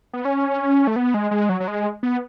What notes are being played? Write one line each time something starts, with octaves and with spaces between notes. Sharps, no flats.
B3
C#4
A3
B3
G#3
G#3
F#3
F#3
G#3
B3